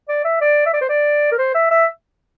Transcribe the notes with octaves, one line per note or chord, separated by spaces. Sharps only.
D5
E5
D5
E5
D5
C5
D5
A#4
C5
E5
E5